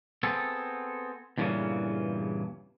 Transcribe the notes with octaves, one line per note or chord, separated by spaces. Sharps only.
B3 C4 G#4 A4
E2 G2 A#2 C#3 E3